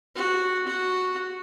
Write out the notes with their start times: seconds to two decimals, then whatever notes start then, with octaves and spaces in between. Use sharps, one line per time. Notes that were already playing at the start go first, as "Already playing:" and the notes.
0.16 F#4
0.67 F#4